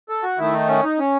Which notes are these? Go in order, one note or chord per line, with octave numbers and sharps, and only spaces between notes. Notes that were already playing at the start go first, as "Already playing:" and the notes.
A4
F#4
D#3 A3 E4
D#4
C#4
D#4
C#4